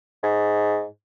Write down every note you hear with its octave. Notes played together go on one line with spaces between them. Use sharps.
G#2